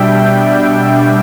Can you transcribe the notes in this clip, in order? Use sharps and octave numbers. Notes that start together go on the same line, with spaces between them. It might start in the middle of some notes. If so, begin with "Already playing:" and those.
Already playing: B2 G3 D4 E5 G5